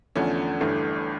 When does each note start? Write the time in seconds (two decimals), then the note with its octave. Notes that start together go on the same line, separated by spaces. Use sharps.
0.16 E2 D3 F3 A3 C#4
0.61 G1 G2 E3 A3